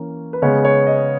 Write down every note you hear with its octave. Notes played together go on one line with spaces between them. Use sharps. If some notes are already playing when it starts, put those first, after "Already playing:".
Already playing: E3 A#3 C#4
B4
C#3 G#3 B3 C#5
C#5
D#5